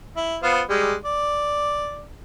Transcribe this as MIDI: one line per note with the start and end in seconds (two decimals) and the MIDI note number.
0.17 0.38 64
0.43 0.61 59
0.43 0.61 65
0.43 0.61 72
0.69 0.94 55
0.69 0.94 56
1.05 2.03 74